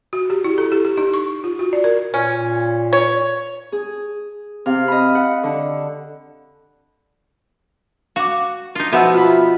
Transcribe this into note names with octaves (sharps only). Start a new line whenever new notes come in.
F#4
G4
E4
A4
G4
G4
D#4
C#6
F4
F#4
D5
A#4
A#2 C#4
C#5
G#4
C3 F5
D#5 B5
F#5
D3
F#4 F5 D6
D#4 F4
B2 F3 B3 E5 F#5 E6
F4 B5